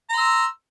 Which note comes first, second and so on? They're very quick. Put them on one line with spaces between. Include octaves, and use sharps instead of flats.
A#5 C6 E6